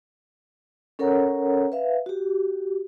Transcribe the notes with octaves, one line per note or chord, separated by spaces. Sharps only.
C#4 A4 A#4 C#5 F#5 A#5
B4 E5 F5
F#4 G4